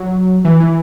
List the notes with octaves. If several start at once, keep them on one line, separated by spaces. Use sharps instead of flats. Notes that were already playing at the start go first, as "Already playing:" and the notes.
Already playing: F#3
E3
E3